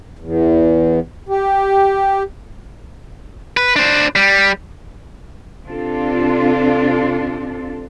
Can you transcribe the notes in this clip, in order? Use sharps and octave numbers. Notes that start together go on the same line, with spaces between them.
E2
G4
B4
D4 C5
G3
C3 C4 D4 F4 A4